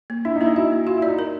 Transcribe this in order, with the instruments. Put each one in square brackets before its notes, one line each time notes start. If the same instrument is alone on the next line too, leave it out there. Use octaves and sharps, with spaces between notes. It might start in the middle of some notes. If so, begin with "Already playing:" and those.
[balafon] A#3
[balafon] D4 [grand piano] E4
[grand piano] D#4
[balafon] A#3 [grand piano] E4
[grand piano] D#4
[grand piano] E4 [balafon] F#4
[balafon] A#3
[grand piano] F4 [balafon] F#4
[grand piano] E4
[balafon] D5
[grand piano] D#4
[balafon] A#4